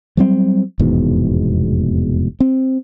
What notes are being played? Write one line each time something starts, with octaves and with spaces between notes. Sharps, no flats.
F#3 G3 C4
F1 E2 G#2 B2
C4